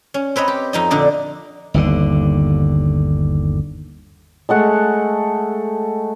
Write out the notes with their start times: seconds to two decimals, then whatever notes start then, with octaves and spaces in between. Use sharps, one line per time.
0.14 C#4
0.36 C4 B4 C#5 D#5
0.48 G4
0.73 F2 D#4 D#5
0.91 A#2 D3 D4 D#5
1.74 G1 D#2 D3
4.49 G#3 A3 F#5